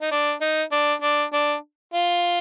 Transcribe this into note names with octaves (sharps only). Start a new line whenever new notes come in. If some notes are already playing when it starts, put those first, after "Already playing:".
D#4
D4
D#4
D4
D4
D4
F4